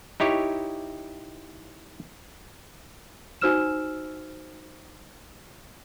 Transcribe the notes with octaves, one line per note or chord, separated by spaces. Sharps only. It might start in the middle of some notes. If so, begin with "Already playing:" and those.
D#4 E4 G4 C#5
D#4 F#4 C5 E6 F6 E7